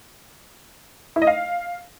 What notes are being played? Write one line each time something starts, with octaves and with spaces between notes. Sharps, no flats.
E4
D#5
F5